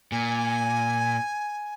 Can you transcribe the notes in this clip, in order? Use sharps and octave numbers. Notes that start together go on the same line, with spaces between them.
A#2 G#5